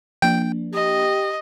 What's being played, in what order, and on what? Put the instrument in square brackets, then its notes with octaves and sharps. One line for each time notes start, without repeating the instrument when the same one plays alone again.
[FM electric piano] F3 A#3 D4 [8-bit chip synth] G5
[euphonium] G4 [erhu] D#5